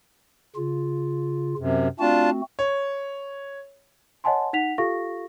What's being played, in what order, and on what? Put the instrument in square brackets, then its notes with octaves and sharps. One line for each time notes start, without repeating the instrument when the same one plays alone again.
[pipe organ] C#3 F4
[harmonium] F#2 C3
[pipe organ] A3 C4 F#4 [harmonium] D4 F4 A5
[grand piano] C#5
[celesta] C#5 D#5 F#5 G#5 A5 C6
D#4 F#5 B6 F7
F4 G4 A4 F5 C#6 A#6